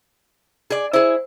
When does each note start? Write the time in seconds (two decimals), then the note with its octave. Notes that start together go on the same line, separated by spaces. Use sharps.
0.70 G#4 D5
0.93 E4 G#4 C5